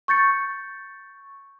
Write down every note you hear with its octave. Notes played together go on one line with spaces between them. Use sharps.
C#6 G6 A6 C#7